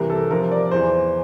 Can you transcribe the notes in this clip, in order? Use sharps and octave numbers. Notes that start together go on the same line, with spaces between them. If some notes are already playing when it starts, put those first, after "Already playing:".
Already playing: C2 C3 E3 A#4
A4
C2 C3 F3 A#4
D5
E2 E3 C5